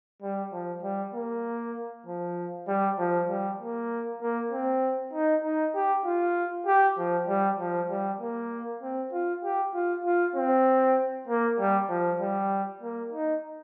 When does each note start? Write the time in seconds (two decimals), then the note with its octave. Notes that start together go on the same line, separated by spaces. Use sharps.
0.22 G3
0.52 F3
0.83 G3
1.14 A#3
2.06 F3
2.68 G3
2.99 F3
3.29 G3
3.60 A#3
4.22 A#3
4.51 C4
5.14 D#4
5.44 D#4
5.75 G4
6.05 F4
6.67 G4
6.98 F3
7.28 G3
7.60 F3
7.90 G3
8.21 A#3
8.82 C4
9.13 F4
9.44 G4
9.74 F4
10.05 F4
10.36 C4
11.28 A#3
11.59 G3
11.90 F3
12.20 G3
12.82 A#3
13.13 D#4